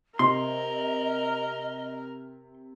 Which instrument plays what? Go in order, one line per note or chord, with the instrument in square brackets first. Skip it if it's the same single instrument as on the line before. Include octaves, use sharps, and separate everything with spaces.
[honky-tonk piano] C3 [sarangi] A#4 [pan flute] D#5 [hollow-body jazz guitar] C6